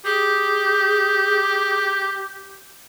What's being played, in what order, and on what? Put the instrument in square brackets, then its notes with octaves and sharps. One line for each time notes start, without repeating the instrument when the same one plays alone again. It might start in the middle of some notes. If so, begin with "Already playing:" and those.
[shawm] G4 [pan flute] G#4